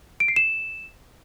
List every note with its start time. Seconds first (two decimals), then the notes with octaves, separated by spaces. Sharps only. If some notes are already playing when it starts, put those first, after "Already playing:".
0.20 D7
0.28 C7
0.36 E7